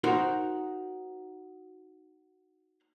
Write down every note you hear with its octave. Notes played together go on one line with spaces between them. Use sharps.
D#4 F#4 A#4 C5